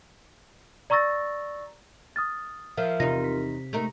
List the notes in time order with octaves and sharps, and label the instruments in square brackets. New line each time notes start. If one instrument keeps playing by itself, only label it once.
[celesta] D5 A#5 C#6 E6 A6 A#6
D#6 F6 A6
[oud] F3 [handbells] A#4 E5 F5
[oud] E2 D#4 [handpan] C3 [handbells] F4 A#4 [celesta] A#6
[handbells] B6
[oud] A3 D#4 A#4